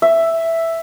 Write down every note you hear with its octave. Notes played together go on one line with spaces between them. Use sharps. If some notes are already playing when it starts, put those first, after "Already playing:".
E5